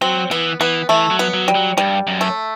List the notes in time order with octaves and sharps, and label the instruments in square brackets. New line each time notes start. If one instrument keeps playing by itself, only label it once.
[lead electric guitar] F#3 [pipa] C4
[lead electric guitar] E3 [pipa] B3
[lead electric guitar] E3 [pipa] B3
[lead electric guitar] E3 [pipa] A3
[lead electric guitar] F#3
[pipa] B3
[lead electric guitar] F#3
[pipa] G3
[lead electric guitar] F#3
[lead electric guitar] G2 [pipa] G3
[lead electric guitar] F#2
[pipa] A3